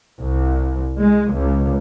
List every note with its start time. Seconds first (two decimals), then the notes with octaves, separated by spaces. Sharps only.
0.20 C2
1.00 G#3
1.36 C#2